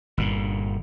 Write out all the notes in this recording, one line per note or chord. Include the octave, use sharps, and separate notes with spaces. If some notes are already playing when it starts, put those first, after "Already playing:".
G1 A#2